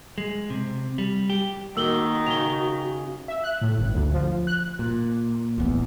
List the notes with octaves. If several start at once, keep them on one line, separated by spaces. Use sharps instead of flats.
G#3
C3
G3
G4
D#3 A#3 F#4 E6 F#7 G7
C#3 F7 G7
E5
F#6
A2
G1
D2
F3
F#6
A#2
F1 E2 A2 B3